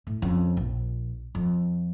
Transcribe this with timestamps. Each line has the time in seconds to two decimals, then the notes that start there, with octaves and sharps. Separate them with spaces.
0.07 A2
0.22 F2 C#3
0.57 A#1
1.35 F2